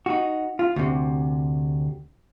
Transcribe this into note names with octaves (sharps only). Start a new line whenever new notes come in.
D#4 F#4
F4
D2 C3